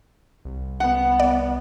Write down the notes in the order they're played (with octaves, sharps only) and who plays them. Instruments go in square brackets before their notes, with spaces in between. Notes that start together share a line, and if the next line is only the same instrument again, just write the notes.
[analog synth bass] C2
[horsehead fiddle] B3 [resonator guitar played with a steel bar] F#5
[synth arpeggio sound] D5